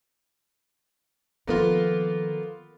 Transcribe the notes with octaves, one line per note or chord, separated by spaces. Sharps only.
D#3 F3 A#3 B3 F4 A4